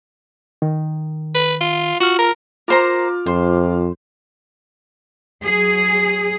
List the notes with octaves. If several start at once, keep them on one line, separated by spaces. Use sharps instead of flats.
D#3
B4
F4
F4 F#4 F6
A#4
F4 A#4 C5 A#5 D6 F6
F2 C5
F#3 G#4